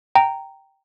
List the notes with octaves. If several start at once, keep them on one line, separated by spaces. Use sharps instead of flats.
G5 A#5